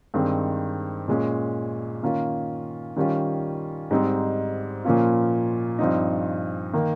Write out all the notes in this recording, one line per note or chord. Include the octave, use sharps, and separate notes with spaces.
G2 D#3 G#3 C4
A#2 G#3 C#4
D#3 A#3 C#4 F4
D#3 G3 C#4 F4
G#2 G3 C4 D#4
A#2 F3 A#3 C#4 F4
G2 F3 C4 D#4
D#3 A#3